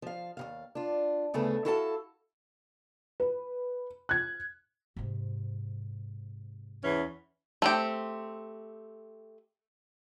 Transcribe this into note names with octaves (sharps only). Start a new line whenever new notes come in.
F3 F5
D#2 C#3 F5
D4 F4
D2 C#3 A3 B3 F#5
E4 F#4 A4 F5 G#5 A5
B4
F#6 G#6
G#2 C3
E2 E3 C#4
A3 C4 G4